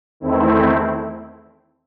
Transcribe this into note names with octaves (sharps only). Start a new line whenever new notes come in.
E2 D#3 A3 C4 E4